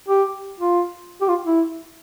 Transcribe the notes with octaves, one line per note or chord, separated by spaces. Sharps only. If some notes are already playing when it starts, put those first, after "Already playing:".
G4
F4
G4
F4
E4